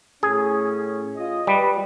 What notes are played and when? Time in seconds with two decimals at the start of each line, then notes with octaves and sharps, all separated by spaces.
0.23 A2 C#4 G#4
1.17 F4 D#5
1.47 G3 B4